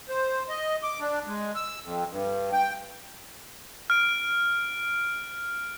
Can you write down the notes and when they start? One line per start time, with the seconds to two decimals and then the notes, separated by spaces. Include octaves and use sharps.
0.09 C5
0.49 D#5
0.83 D6
1.00 D4
1.26 G#3
1.55 E6
1.82 F2
2.10 G2
2.53 G5
3.90 F6 D7